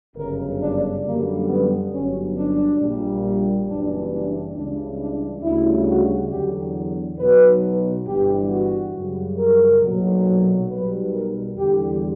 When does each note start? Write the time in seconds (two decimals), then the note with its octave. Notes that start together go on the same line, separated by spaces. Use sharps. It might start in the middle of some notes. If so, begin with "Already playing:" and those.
0.16 G1 F#2 C#3 A#4
0.60 D4
1.04 F#2 D3 G3 A#3
1.48 B3
1.91 G1 G2 F#3 C#4
2.36 D4
2.79 A#1 A#2 G3
3.67 F#1 F#2 E3 G3 D4
4.11 D4
4.55 C#2 C#3 E3 G3 D4
4.99 D4
5.42 D2 C#3 G3 E4
5.87 F#4
6.30 E2 D3 F#3 G4
7.18 B1 B2 F#3 B4
8.06 G1 G2 E3 G3 G4
8.50 F#4
8.94 F#2 C#3 G3
9.37 A#4
9.82 B1 A#2 F#3
10.69 B1 B2 G3 B4
11.12 A#4
11.56 E2 D3 G3 G4